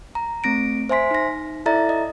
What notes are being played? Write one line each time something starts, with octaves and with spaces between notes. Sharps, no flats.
A#5
A3 C4 A#6 D7
C5 E5 G#5 C6 B6
D#4 A#6
E4 A4 D5 E5 A#5 A6
D#5